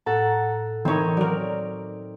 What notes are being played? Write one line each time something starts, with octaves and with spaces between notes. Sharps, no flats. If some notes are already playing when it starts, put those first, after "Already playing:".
A2 A4 F#5 A#5
D#3 E3 C4 D#4 C#5
F#3 A#4 D5